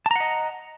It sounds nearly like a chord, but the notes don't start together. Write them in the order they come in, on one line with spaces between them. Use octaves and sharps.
A5 A#5 F#5 D#5